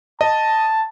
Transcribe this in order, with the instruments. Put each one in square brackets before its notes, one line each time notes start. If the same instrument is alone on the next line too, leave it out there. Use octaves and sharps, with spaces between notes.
[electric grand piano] D#5 [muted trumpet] A5